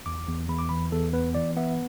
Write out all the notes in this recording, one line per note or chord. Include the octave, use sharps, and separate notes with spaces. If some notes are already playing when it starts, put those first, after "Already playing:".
E2 D6
E2
E2 B5
D6
E3 B5
E2 A4
B3 B4
E3 D5
B3 E5